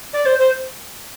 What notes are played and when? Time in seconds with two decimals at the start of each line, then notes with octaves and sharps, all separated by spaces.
0.13 D5
0.26 C5
0.39 C5